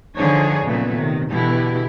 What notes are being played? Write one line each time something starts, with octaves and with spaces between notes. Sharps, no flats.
D3 F3 D4 D#4 G#4 C#5
A#2 C#3 F3 F#3 A3 B3
C3 D#3
B2 D3 E3 E4 G4